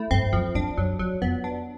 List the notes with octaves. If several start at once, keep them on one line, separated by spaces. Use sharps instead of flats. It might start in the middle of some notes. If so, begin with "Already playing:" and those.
Already playing: A3 E4
G2 C4
F#2 F3
F2 D4
F#2 F#3
F2 F#3
F2 B3
D4